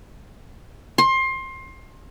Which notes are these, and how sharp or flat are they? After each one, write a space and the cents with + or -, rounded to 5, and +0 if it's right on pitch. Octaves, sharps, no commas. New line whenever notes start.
C6 +25